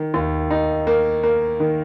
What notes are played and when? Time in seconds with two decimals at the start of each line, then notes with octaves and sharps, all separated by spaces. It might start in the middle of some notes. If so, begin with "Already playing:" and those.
Already playing: D#3
0.14 D#2
0.50 D#4
0.87 A#3
1.23 A#3
1.60 D#3